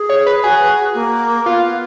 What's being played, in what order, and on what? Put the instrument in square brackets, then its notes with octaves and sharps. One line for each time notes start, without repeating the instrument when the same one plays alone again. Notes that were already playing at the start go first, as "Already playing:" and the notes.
Already playing: [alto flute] G#4
[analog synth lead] C#5
B4
[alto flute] F#4 [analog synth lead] G#4
[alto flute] A#3
[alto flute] B3 [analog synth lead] F4